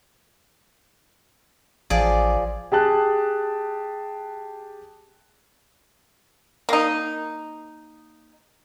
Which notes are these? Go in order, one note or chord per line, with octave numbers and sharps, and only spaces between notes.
A1 F3 G#4 D5
G4 G#4 A5 F#6
A#3 D#4